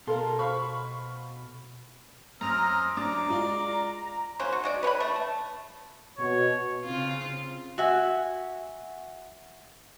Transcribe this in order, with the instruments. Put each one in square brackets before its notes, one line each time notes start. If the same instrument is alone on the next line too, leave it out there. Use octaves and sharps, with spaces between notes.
[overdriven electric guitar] B2 [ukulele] A4 [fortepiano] A#4 F5 C6
[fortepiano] C5 F5 [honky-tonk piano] B5 C#6
[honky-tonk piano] F#2 [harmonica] C4 D#6 F6 [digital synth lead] A#5
[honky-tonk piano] F#2 D4 A6 [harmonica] D6
[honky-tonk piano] G#3 F4 D5
[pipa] F#3 A#3 C#4 C5
F#4
G#3 F#4 D5
B4 C#5 G5 B5
A3
A5
[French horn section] B2 [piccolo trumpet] C#5
[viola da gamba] C#3 C4 F4
[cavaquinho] F#4 E5 G#5